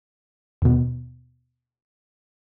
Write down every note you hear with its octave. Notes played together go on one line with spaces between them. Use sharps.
D#2 B2